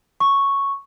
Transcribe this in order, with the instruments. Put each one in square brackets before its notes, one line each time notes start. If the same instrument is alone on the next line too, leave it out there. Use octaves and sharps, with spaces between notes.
[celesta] C#6